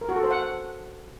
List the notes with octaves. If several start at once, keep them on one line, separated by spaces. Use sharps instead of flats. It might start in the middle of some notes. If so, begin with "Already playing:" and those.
A#4
F#4
A4
C5
F#5